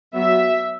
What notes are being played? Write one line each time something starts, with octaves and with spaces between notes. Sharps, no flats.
F#3 B3 E5